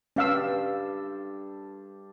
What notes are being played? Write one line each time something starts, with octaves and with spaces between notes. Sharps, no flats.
G2 C#4 A4 F5 G5 E6